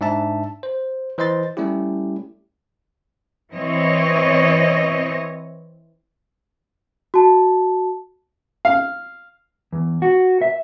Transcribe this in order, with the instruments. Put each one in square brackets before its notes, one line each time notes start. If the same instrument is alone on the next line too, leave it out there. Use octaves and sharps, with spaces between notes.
[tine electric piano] G#2 D4 E5 A5
C5
E3 C5 D#5 C6 A6
G3 A3 C#4 E4 G4
[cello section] E3 C4 C#5 D#5
[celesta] F#4 A5
[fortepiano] F5
[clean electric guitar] E2
F#4
E5